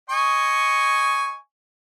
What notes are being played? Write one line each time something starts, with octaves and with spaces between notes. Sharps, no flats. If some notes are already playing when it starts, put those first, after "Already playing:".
D#5 G#5 C#6